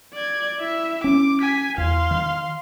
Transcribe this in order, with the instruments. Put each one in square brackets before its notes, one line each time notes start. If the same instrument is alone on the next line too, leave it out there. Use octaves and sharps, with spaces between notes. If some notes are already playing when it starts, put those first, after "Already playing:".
[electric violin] D5 G#6
E4 E5
[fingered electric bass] C#4 [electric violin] D6
[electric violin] G#5 B6
[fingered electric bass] E2 [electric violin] F5 C6
[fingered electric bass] D#3